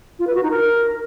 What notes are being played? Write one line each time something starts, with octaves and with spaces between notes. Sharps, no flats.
F4
B4
F#4
D#4
A#4